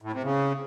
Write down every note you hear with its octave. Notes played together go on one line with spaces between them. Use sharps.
A2
C3
C#3